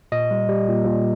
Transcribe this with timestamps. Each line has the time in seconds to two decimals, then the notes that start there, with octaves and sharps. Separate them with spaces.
0.12 A#2 D#5
0.31 G3
0.49 G3
0.68 A#2
0.86 A#2